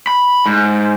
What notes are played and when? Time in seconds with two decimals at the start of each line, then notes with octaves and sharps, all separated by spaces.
0.07 B5
0.46 G#2